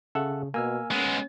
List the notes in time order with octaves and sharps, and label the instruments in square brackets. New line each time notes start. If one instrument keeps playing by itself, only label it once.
[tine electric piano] C#3 [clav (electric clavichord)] A4 E5 F#5
[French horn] B2 [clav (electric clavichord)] A#3 [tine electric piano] G#5 E6 F6
[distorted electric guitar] G#3 B3 [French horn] C#4